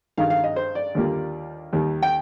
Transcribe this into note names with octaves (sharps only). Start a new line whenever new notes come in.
G2 D#3 G#3 D#4 F5
F5
D#5
C5
D5
D#2 D3 G3 A#3 F4
D#2 D#3 G3
G5